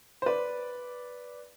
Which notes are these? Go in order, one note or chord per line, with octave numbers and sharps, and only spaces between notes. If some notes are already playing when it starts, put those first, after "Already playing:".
C5
B4 D5